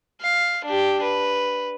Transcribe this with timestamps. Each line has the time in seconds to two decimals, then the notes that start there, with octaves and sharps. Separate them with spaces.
0.22 F5
0.65 D4 G4
1.02 B4